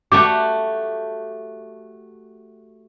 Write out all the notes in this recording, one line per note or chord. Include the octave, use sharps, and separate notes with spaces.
A3 F#4 G4 D6